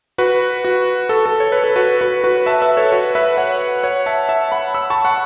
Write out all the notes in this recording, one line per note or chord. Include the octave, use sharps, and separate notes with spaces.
F#4 B4
F#4
A4
A4
C#5
B4
A4
F#4 B4
F#4 B4
F#4 B4
E5 A5
B4 E5
A4 C#5
F#4 B4
B4 E5
C#5 F#5
C#5 F#5
E5 A5
E5 A5
F#5 B5
B5 E6
A5 C#6
F#5 B5